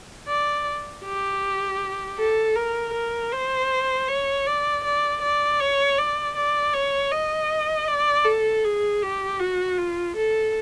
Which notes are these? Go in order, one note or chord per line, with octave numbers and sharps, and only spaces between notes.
D5
G4
A4
A#4
A#4
C5
C#5
D5
D5
D5
C#5
D5
D5
C#5
D#5
D5
A4
G#4
G4
F#4
F4
A4